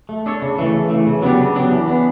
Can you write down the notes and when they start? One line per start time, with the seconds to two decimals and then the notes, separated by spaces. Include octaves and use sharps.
0.09 A3
0.26 D4 A4 C#5
0.42 C#3
0.58 E3 A3
0.74 C#3
0.90 E3 A3
1.06 C#3
1.22 F#3 B3 D4 G4
1.39 C#3
1.55 F#3 B3 D4 G4
1.72 E3
1.88 B3 D4